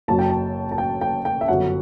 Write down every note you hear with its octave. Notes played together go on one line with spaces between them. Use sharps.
F#1 F#2 F#3 A5
G5
A5
A5
G5
G5
G5
E5
G1 F#2 F#3 F#5